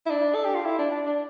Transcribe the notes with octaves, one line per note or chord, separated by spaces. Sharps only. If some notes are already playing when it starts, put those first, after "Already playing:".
E4
D4
A4
G4
F4
E4
D4
D4
D4